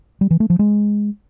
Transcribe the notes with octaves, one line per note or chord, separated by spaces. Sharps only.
G3
E3
A3
F3
G#3